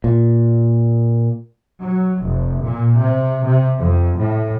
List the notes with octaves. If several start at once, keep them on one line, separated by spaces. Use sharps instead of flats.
A#2
F#3
F1
A#2
C3
C3
F2
A2